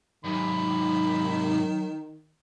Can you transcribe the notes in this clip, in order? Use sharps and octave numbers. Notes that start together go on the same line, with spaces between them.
G#2 C3 D#3 F#3 B5